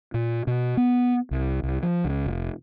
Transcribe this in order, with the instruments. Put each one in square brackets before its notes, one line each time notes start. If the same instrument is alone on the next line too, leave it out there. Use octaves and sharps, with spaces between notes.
[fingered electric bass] A#2
B2
B3
C2
C2
F3
C#2
F1